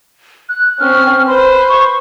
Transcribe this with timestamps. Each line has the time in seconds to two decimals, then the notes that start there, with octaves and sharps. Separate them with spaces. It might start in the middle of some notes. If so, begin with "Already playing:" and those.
0.49 F#6
0.80 C4 C#4 F6
1.28 B4 C5 C6
1.69 C#6